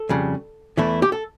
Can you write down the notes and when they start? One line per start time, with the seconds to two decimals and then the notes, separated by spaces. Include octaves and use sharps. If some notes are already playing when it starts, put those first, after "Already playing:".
Already playing: A4
0.09 F2 C#3 G3
0.77 E2 E3 A3 E4
1.02 G4
1.12 A4